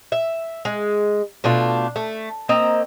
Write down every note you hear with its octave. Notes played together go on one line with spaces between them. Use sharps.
E5
G#3
B2 A3 D4 F4
A3
A#3 C4 D#5 A#5